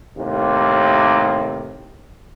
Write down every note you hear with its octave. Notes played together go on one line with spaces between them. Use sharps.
D#2 A2 C3